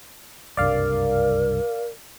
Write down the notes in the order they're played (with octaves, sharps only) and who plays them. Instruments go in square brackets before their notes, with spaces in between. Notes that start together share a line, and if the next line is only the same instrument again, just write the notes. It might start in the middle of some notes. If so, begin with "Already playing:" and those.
[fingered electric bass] F#1 C2 G2 [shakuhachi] A#4 [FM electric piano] D5 F5